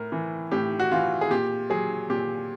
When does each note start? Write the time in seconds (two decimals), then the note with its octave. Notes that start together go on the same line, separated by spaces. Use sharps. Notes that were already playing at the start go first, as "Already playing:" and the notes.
Already playing: A2 A#4
0.12 E3
0.52 A2 G4
0.80 F#4
0.92 E3 F4
1.21 G#4
1.30 A#2 G4
1.70 F#3 G#4
2.10 A#2 G4